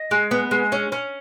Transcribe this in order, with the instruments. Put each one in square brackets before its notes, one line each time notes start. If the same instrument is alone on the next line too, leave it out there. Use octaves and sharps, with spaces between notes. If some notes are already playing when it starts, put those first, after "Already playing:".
Already playing: [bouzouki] D#5
G#3
B3
G#3
C#4
C#4